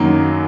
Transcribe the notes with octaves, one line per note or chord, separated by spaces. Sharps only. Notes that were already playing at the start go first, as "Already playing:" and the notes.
Already playing: F#2 D#3 F#3 A#3 D#4